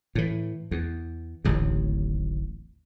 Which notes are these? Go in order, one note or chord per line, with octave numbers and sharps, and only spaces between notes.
A2 E3
E2
D1 A1 D#2